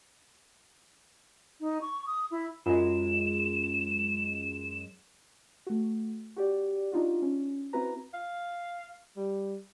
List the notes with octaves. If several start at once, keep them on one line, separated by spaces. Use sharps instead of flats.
D#4
C#6
D#6
E4
F#2 G#3 F4 E7
A3 F#4
F#4 G4 D5
D4 D#4 F4 F#4
C#4
C4 E4 F#4 B4 A#5
F5
G3